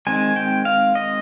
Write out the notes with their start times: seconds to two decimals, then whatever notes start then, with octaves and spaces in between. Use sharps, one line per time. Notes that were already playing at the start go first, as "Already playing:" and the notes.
0.07 D#3 G#3 C4 G#5
0.36 G5
0.65 F5
0.95 D#5